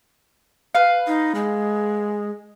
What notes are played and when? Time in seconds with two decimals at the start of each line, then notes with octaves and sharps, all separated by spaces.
0.74 B4 F5
1.07 D#4
1.35 G#3